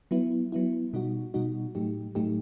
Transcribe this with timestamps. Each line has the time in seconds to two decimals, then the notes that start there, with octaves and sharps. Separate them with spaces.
0.11 F#3 B3 E4
0.52 F#3 B3 E4
0.93 B2 G3 D#4 F#4
1.34 B2 G3 D#4 F#4
1.75 A2 F#3 A3 D#4 G4
2.15 A2 F#3 A3 D#4 G4